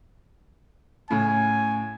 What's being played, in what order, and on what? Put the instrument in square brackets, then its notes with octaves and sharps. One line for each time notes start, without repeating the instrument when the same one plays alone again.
[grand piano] A2 C#3 [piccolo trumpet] G#5